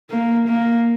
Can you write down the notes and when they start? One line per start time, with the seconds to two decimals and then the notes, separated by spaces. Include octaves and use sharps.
0.11 A#3
0.48 A#3